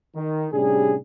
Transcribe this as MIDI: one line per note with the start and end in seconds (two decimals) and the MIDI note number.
0.16 0.47 51
0.52 0.96 45
0.52 0.96 48
0.52 0.96 55
0.52 0.96 61
0.52 0.96 62
0.52 0.96 68